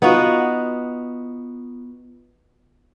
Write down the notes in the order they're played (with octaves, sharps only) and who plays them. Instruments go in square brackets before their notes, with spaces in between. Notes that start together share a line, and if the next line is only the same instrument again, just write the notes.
[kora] B3 D#4 F4 F#4